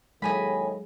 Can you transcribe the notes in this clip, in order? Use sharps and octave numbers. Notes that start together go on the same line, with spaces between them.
D#2 A2 F#3 G#3 D#5 G#5 B5